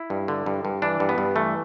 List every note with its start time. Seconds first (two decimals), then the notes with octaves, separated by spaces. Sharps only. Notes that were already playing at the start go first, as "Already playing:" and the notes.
Already playing: E4
0.10 G2
0.28 D3
0.46 G2
0.65 G2
0.82 E3 D4
1.00 G2
1.09 B3
1.18 G2
1.36 E3 A3